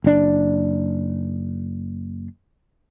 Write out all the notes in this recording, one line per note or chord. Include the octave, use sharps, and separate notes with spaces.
F#1 D4